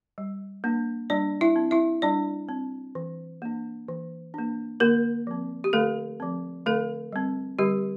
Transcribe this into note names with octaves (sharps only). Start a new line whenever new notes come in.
G3
A#3 D4
G3 D4 D5
E4 E5
C4
E4 E5
G3 D4 D5
C4
E3
A#3 D4
E3
A#3 D4
D3 A#3 A#4
F3 C4
G4
D3 A3 A4
F3 C4
D3 A3 A4
G3 C4
D3 G3 G4